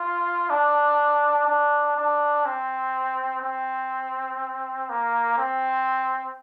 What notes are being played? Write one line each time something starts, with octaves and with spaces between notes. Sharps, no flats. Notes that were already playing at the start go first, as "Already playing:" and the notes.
Already playing: F4
D4
D4
D4
C4
C4
A#3
C4